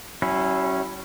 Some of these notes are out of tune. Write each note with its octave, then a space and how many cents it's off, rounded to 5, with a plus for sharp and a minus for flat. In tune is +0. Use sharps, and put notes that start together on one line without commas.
F#3 +45 C#4 -10 E4 +0